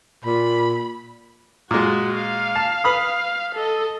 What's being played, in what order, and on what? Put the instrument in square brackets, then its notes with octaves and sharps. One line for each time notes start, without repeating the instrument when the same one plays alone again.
[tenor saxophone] A#2 [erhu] B5
[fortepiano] A#2 G#3 [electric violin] F#4
[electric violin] F5
[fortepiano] A5
B4 B5 D#6
[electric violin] A4 D#5